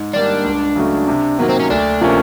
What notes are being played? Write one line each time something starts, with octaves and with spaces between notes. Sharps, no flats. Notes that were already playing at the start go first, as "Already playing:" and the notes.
Already playing: G#2
D#3 G3 A#3 D4
C#2
C#3 F#3 A3
C3
D#3 F#3 A#3 B3
C4
C#4
D2 D4
C3 F3 A#3 C#4